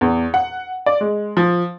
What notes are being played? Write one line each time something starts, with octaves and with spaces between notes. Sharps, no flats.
E2
F#5
D5
G#3
F3